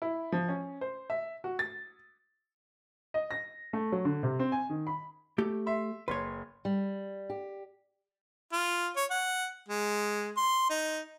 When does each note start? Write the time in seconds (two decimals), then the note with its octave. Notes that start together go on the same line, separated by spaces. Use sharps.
0.02 E4
0.32 F3
0.48 C#4
0.81 C5
1.10 E5
1.44 F#4
1.59 A6
3.14 D#5
3.31 A#6
3.73 A3
3.92 F#3
4.05 D3
4.23 C3
4.39 C4
4.52 G#5
4.70 D#3
4.87 B5
5.38 A3 G4
5.66 E5 C6
6.08 F#1 B4 C#5 C6
6.65 G3
7.30 G4
8.52 F4
8.96 C#5
9.11 F#5
9.68 G#3
10.37 C6
10.69 D#4